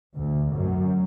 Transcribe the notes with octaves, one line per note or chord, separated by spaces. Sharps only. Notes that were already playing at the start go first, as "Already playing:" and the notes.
D2
F#2